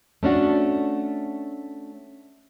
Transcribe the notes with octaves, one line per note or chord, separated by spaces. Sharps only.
A3 C#4 D4 F#4